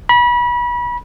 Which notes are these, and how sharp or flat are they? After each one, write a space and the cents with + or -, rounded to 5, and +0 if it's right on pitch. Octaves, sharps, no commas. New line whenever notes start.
B5 -30